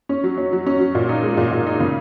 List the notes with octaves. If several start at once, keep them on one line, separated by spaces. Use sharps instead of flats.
C#4
F#3
C#4
F#3
C#4
F#3
A#2
D#4
G#3
A#2
A#2
D#4
C#3